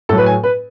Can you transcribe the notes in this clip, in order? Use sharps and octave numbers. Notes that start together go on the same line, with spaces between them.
A2 F#3 A4
B4
G#5
B4